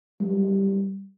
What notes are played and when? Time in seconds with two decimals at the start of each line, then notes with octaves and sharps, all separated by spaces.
0.21 G3